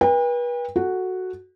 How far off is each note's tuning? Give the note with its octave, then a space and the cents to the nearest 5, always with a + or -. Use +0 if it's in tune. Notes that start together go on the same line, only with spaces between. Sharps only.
B4 -35 G5 +40
F#4 +0 A4 +0